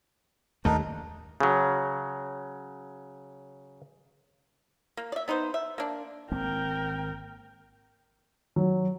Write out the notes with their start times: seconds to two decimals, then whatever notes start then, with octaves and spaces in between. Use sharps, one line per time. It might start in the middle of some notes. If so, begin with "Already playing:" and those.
0.65 D#2 A3 D4 D#4 A#4
1.40 C#3 F#3
4.97 A#3
5.12 D5 E5
5.28 B3 D#4 B4 C5
5.54 E5
5.78 A#3 D4
6.32 G#1 A#3 C4 A#4 G5
8.56 F#3